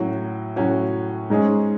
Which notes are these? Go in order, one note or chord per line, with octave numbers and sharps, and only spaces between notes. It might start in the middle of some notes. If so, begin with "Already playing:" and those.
Already playing: A2 F#3 C#4 F#4
A2 F#3 C#4 F#4
G#2 G#3 C#4 G#4